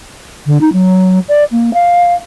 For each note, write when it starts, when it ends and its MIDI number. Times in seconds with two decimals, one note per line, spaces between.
0.46 0.60 50
0.61 0.72 63
0.73 1.19 54
1.29 1.44 74
1.52 1.73 58
1.74 2.13 77